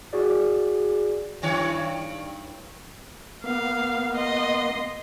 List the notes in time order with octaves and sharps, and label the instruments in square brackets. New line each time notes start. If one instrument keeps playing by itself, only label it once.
[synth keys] F#4 G#4 D5
[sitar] G2 D#3 C#5
[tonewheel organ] A#3 B3 [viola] F5
[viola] D#5 C6